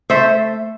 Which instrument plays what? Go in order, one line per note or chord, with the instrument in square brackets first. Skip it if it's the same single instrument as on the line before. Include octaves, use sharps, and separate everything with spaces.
[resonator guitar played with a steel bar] A3 C5 E5